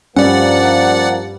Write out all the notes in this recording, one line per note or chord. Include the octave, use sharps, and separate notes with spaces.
G2 F3 G3 A#3 C#4 D5 F#5